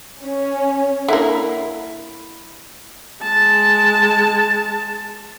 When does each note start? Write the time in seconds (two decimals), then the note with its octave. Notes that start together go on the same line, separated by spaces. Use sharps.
0.23 C#4
1.09 D3 A#3 E4 A#5
3.22 G#3 A5